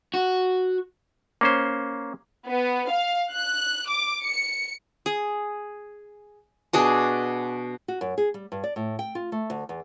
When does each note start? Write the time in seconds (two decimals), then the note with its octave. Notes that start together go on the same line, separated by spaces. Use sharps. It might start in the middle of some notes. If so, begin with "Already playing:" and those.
0.14 F#4
1.41 A#3 C#4 C5
2.48 B3
2.90 F5
3.30 F#6
3.88 D6
4.24 C#7
5.06 G#4
6.73 B2 D4 G#4
7.88 F#4
8.01 F#2
8.18 G#4
8.34 G3
8.52 G2
8.64 D5
8.76 A2
8.99 G5
9.15 F4
9.32 A3
9.50 D2
9.69 E2